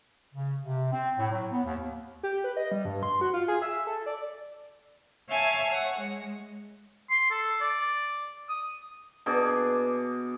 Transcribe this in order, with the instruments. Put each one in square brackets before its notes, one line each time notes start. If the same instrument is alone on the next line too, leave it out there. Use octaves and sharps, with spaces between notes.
[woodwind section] C#3
C3
C4
A2
F#3
B3
D#2
[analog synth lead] G4
B4
D#5
G3
G2
C6
F#4
F4
G#4
E5
A4
D5
[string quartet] C#5 E5 F5 G#5 A5
C#5 F#5
G#3
[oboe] C6
A4
D5
D#6
[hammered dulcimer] B2 D4 G#4 D6